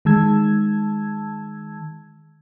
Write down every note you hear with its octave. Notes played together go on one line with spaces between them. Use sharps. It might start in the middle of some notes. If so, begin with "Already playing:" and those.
D#3 G#3 A5 E6 G#6